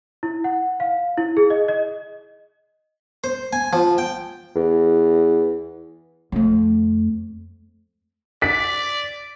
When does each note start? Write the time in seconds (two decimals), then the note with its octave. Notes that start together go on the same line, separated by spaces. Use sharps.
0.23 E4
0.44 F#5
0.80 F5
1.18 E4
1.37 G#4
1.50 D#5
1.68 D#5
3.24 C5
3.53 G#5
3.73 F3
3.98 G5
4.56 E2
6.32 F2 A3
8.42 D5 B6